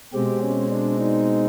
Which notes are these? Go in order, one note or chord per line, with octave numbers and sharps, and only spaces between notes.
B2 G#3 C4 G4
C#4
D4
D#4